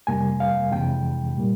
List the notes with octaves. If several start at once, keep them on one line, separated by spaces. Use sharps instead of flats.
F2 C3 G3 A#3 G#5
F5
F2 C3 E3 G#3 G5
A#2 G3 A#3